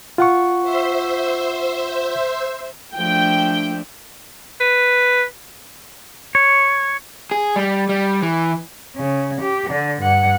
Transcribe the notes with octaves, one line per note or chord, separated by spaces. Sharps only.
F4 F#5 C#6
C5 E5
F3 A3 D4 G5
B4
C#5
G#4
G3
G3
E3
C#3
G4
D3
G2 F#5